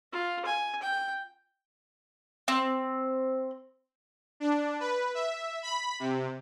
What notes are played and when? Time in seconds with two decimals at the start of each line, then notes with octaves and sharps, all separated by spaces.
0.12 F4
0.45 G#5
0.82 G5
2.48 C4
4.40 D4
4.80 B4
5.15 E5
5.63 B5
6.00 C3